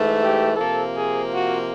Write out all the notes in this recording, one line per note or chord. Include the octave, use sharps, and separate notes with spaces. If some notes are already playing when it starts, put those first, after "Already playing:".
Already playing: G#2 E3 A3
G4
C3 F3 A#3 A4
G#4
F#4